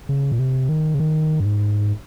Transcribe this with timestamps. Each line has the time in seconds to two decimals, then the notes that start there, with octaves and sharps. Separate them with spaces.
0.09 C#3
0.32 A#2
0.39 C3
0.69 D#3
0.94 C#3
1.00 D#3
1.40 G2
1.45 G#2